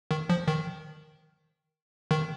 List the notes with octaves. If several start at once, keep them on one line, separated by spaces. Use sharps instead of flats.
D#3
F3
D#3
D#3